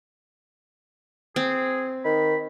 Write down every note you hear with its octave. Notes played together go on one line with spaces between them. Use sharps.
C4 G#4
D#3 B5